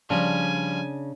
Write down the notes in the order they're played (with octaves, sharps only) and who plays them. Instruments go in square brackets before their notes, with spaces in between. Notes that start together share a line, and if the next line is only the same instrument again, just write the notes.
[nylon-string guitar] C#3 [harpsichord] F3 G3 [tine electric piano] D4 [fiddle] G#5